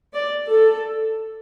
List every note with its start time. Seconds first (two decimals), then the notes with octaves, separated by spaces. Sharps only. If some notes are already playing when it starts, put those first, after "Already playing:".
0.13 D5
0.52 A4